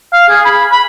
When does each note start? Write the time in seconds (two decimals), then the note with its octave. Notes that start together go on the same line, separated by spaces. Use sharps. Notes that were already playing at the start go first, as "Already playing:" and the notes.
0.13 F5
0.29 G#4
0.45 B5
0.71 B5